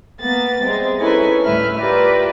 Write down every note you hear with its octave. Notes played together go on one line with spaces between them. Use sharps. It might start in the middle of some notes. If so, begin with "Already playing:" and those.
A#3 B3 A6
C3 G3 G#3
C#4 D#4 E4 A4 B4 G#5
D2 A2 G3 B4 E5 F6
F4 G4 A#4 B4 D5 E5